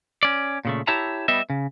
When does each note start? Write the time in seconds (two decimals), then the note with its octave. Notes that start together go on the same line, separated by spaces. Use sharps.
0.23 C#4 D5
0.65 A#2 C#3 A3
0.87 E4 G4 C#5 E5 A5 A#5
1.28 G3 B3 D#5 E5
1.50 C#3